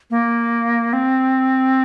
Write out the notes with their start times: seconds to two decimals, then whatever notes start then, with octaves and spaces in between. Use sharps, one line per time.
0.10 A#3
0.93 C4